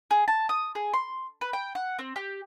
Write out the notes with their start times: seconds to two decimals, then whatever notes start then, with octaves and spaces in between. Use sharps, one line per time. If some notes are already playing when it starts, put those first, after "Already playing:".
0.11 G#4
0.28 A5
0.49 D#6
0.75 G#4
0.94 C6
1.41 B4
1.53 G5
1.75 F#5
1.99 C4
2.16 G4